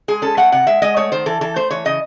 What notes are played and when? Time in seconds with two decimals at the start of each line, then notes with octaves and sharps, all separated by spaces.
0.08 G#3 G#4
0.22 C#4 A4
0.37 A3 F#5
0.52 C3 F#5
0.67 G#3 E5
0.82 G#3 D#5
0.96 A3 C#5
1.12 D#3 C5
1.26 E3 A4
1.41 E3 A4
1.56 A3 C5
1.71 E3 C#5
1.85 C#3 D#5